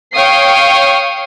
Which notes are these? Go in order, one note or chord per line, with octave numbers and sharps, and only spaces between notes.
C#5 F5 G5 C#6 D#6 C7